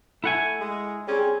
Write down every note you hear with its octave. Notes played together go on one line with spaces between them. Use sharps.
A3 E4 F#5 G#5
G#3
G3 C4 C#4 G#4